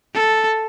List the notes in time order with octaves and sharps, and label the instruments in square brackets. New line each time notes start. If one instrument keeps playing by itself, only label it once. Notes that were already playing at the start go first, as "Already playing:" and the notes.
[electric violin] A4